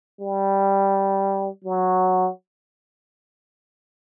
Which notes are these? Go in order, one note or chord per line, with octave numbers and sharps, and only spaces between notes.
G3
F#3